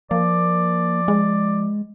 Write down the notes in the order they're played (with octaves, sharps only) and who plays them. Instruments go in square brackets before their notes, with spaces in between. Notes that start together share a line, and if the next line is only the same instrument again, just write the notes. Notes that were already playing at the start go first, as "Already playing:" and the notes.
[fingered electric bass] F3 [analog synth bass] A#3 [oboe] D5
[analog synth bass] G#3